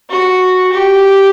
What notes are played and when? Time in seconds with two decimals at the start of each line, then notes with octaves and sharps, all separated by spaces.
0.10 F#4
0.72 G4